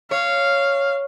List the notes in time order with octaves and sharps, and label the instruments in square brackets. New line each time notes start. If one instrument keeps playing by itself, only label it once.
[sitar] C#5 [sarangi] F5